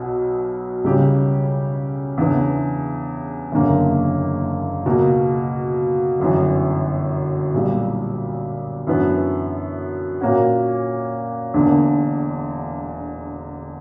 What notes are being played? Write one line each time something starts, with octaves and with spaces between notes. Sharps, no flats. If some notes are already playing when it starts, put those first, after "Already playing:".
Already playing: B1 B2 F#3
C#2 C#3 G3 C#4 G4
E2 C#3 E3 B3 D4
F#1 E2 D3 A#3 C#4
C#2 B2 A#3
G1 F#2 E3
B1 A#2 G3
F#2 E3 B3 D4
A#2 A#3 C#4 F#4
E1 E2 D3 A#3 D4